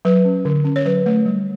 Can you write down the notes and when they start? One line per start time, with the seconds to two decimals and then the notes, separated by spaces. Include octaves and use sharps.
0.05 F#3 B4
0.25 C#4
0.45 D3
0.65 C#4
0.76 C#5
0.85 F#3 B4
1.06 A3
1.26 G3